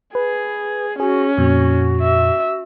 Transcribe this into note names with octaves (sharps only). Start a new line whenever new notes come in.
G#4 B4
C#4 F#4 G#4
F2 A#2 F#4
E5